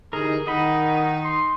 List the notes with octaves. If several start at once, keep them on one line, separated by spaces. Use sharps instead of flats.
D3 E3 D#4 G4 G#4 A#4
D#3 D#4 D#5 F#5 B5
C6